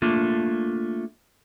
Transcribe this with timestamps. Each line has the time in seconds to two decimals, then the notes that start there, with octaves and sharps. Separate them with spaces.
0.02 A3 A#3 D4 F4